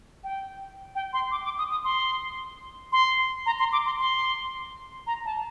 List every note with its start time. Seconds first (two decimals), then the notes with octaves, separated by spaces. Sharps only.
0.24 G5
0.95 G5
1.13 C6
1.31 D6
1.44 D6
1.58 D#6
1.71 D#6
1.84 C6
2.92 C6
3.46 A#5
3.59 C6
3.73 D6
3.86 C6
4.00 C6
5.07 A#5
5.25 A5